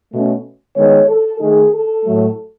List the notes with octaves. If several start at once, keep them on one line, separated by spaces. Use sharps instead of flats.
B2 A3 C#4
D#3 G#3 B3 D#4 C#5
A4
D#3 A3 D#4 G#4
A4
A2 F#3 A3